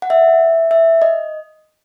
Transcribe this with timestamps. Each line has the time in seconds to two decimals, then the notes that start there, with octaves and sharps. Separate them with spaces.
0.02 F#5
0.10 E5
0.71 E5
1.02 D#5